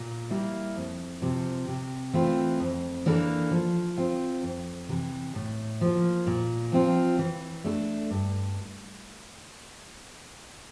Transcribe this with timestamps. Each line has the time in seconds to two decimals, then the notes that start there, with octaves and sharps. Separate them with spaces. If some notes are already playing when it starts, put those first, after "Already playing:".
Already playing: A#2
0.30 G3 A#3 E4
0.76 F2
1.21 C3 F3
1.68 C3
2.13 E3 A3 C4 F4
2.59 F2
3.06 E3 A#3 D4 A4
3.51 F3
3.98 C4 F4
4.43 F2
4.89 C3 E3
5.35 A2
5.81 F3 A#3
6.27 A#2
6.72 F3 C4 F4
7.19 E3
7.64 A3 D4 A4
8.10 G2